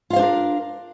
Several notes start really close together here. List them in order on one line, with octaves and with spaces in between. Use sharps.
F4 F5 C5 D4 A#4